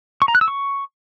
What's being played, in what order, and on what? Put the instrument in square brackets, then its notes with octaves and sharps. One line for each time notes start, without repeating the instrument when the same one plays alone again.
[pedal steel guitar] C#6
A#5
F#6
E6
C#6